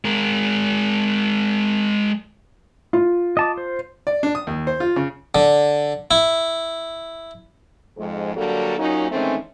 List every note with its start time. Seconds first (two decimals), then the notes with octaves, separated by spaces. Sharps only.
0.05 G#3 A#4
2.93 F4
3.37 D#5 A5 D6
3.58 C5
4.07 D5
4.23 D4
4.35 D#6
4.47 D#2
4.67 C5
4.80 F4
4.96 C#3
5.35 D3
6.11 E4
7.98 F2 G#2 G#3
8.36 D3 F#3 G3 A#3 A4
8.79 A#2 F#3 A#3 C#4 D#4
9.11 G#2 D#3 E3 A3 C4 C#4